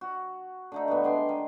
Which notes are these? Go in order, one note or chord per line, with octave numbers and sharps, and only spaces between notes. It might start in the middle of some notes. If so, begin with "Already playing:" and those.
F#4
D3 A3 D#4
G2 E3 B3
G#3 D4 G5 C6
D#3